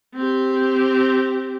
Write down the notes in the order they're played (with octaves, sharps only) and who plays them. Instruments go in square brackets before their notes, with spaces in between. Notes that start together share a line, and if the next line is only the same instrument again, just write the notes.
[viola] C4 G4